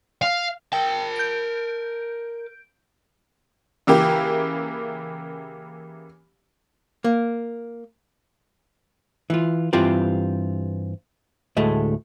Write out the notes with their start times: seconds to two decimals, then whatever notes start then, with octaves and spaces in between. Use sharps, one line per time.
0.22 F5
0.73 A#4 G5 A5
1.16 G6 D7
3.87 C#3 E3 A#3 G4
7.04 A#3
9.30 E3 F4
9.73 G2 E3 C4 F4 G4
11.56 D2 A2 G#3 A3